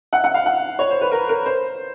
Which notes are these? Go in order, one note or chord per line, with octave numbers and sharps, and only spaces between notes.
F#5
F#5
F5
F#5
C#5
C5
B4
A#4
A#4
C5